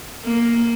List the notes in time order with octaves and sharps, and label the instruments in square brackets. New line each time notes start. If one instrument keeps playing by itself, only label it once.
[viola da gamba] A#3